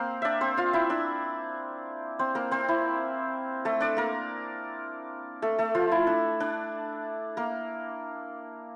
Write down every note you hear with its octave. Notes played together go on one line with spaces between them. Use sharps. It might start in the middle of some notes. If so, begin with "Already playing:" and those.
Already playing: A#3 C4 A#4 C5
D4 D5 E5
C4 C5
F4 F5
E4 E5
D4 D5
C4 C5
A#3 A#4
C4 C5
E4
A3 A4
D4 D5
A#3 A#4
A3 A4
A3 A4
F3 F4
E4
D4
D4
A#3 A#4